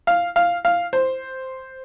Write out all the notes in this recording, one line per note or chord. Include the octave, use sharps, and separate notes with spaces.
F5
F5
F5
C5